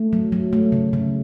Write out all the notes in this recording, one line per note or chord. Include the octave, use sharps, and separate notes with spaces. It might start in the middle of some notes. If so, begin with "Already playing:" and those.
Already playing: A3
F#3
F#3
A3
C#3
C#3